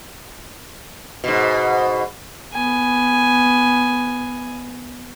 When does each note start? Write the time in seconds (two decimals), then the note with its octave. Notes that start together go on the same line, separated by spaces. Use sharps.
1.24 G#2 B2
2.54 B3 G#5